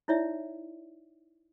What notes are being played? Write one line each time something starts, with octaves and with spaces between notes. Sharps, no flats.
D#4 E4 C#5 D5 E5